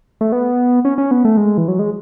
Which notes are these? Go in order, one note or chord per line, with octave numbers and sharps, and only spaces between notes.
A3
B3
C#4
C#4
B3
A3
G#3
E3
F#3
G#3